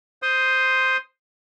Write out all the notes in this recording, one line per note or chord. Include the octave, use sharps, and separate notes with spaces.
C5 C6 D#6